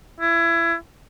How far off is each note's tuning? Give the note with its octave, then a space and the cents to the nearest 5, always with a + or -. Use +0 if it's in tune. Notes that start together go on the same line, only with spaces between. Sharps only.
E4 +25